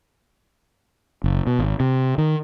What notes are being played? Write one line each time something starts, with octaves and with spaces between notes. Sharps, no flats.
F#1
B2
G#1
C3
D#3